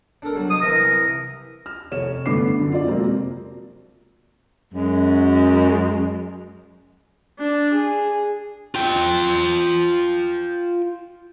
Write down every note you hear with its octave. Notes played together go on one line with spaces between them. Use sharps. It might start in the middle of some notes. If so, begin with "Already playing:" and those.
D4 A4 A#4
F#3 G3
C5 D#5 A5 D#6
C2 E3 A#4 E5
F6
F1 C#5 E7
G2 D3 A3 B3 D6 C7
F#2 D3
F4 D5
F2 C3 F#3 G#3 A#3 C4
F#2 G#3
D4
G#4
F4 G5